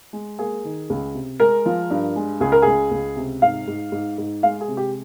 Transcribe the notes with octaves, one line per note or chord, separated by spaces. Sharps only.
G#3
A#3 G#4
D#3
C#2
C3
G#3 A#4
F3
G2
G#3
C#2 G#4
A#4
C#2 G#4
C#2
C3
G#2 F5
G#2
G#2
G#2
G#3 F5
G#4
C3
G4